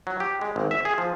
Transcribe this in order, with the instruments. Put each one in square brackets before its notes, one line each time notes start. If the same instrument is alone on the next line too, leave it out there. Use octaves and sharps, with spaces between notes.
[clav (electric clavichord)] F#3
G4
G#3
G#1
E5
G#4
F3